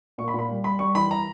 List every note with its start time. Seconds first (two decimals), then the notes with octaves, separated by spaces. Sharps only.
0.18 A#2 C#6
0.28 B5
0.34 A#2
0.39 B5
0.49 G3
0.64 G3 B5
0.79 G3 C#6
0.95 E3 B5
1.11 A#5